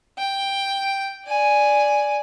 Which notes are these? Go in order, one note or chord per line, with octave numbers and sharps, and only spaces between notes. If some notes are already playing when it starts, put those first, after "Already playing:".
G5
D5 G#5